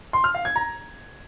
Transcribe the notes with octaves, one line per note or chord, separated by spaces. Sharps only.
C6
F6
F5
G#6
A#5